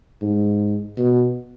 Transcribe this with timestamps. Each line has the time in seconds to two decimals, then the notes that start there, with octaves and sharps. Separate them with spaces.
0.22 G#2
0.98 B2